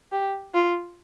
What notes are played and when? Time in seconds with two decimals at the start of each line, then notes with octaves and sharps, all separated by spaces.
0.12 G4
0.54 F4